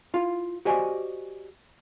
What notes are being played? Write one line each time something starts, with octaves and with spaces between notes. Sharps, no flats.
E4 F4 F5
F#4 G4 C5 D5 D#5 G#5